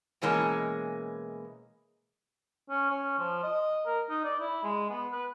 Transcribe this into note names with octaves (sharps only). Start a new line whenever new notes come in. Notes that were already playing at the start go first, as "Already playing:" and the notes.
B2 E3 G#3 A#3 C#4
C#4
C#4
F3
D#5
A#4
D#4
D5
E4
G#3
B3
B4